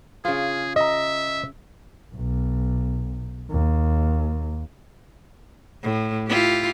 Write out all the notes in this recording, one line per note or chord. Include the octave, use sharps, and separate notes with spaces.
C#3 F4 G#4
D#5 E5 A#5
B1
D#2
A2
E4 F4 G4